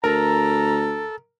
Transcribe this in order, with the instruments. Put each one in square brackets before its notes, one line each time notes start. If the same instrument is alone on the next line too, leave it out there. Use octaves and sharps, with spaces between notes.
[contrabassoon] D2 [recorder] A4 [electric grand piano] A#4 [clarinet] A#5